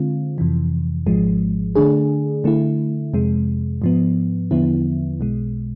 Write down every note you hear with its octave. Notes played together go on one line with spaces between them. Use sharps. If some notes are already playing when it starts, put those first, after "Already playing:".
Already playing: D3 G#3 C4 F4
F2 C3 E3
G#1 G#2 F3 G#3
D3 A3 D4 G#4
D3 A3 E4
F2 C3 G#3
G#2 F3 B3
E2 D3 F3 B3 E4
B1 B2 G#3